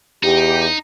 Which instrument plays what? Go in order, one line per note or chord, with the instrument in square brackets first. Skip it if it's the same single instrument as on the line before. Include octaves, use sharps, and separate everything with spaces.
[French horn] E2 [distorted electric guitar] D#4 [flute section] G4